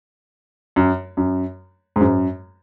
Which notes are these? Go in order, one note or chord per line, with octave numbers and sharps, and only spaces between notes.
F#2
F#2
G#2
F#2